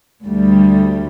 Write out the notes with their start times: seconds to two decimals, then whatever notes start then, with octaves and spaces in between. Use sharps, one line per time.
0.24 D2 G3